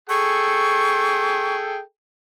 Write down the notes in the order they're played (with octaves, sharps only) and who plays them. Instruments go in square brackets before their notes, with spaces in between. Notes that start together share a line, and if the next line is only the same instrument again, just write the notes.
[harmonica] G#4 A4 G5 [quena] C#6